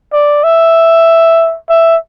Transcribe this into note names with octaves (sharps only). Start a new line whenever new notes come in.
D5
E5
E5